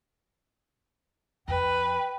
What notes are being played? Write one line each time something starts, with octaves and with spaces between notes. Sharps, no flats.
F2 B4 G5